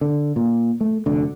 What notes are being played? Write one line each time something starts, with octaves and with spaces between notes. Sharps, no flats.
D3
A#2
A3
F1 D2 D3